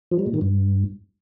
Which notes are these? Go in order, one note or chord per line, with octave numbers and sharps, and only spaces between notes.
F3
G3
A#2
D#3
G2